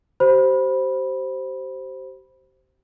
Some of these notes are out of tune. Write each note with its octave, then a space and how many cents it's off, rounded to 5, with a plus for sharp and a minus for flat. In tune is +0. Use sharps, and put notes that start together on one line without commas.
G4 -35 C5 +0 B5 -10